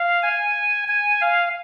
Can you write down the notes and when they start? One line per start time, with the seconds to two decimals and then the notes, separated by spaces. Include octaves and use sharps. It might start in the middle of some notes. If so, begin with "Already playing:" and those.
Already playing: F5
0.23 G#5
0.88 G#5
1.21 F5